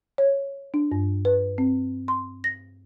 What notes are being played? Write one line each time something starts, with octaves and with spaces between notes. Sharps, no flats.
C#5
D4
G2
B4
C4
C6
A#6